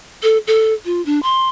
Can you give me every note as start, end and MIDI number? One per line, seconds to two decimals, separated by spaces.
0.23 0.38 69
0.47 0.74 69
0.85 1.04 65
1.06 1.20 62
1.23 1.49 84